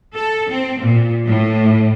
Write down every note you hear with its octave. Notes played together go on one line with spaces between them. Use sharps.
A4
C4
A#2
A2